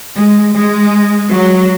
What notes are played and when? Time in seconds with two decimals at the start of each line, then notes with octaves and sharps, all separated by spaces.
0.16 G#3
0.55 G#3
1.29 F#3